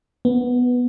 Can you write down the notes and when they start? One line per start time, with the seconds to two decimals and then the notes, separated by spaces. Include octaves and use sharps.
0.25 B3